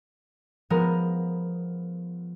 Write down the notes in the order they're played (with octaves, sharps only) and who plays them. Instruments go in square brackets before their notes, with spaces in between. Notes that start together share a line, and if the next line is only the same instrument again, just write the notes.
[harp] F3 G#3 B3 A#4